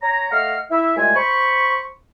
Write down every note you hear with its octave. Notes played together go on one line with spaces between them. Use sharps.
C#5 A#5
A3 D#5 F5 F#5 F6
E4 E5
C2 G#3 A3 F4 G#5
C5 B5 C#6